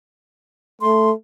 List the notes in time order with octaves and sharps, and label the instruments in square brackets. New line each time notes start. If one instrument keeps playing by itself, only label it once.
[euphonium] A3 [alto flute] C6